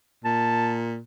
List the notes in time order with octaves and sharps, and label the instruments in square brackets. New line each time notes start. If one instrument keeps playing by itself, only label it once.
[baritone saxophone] A#2 [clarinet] A5